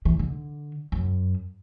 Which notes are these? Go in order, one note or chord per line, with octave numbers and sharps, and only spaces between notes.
E3
D3
F#2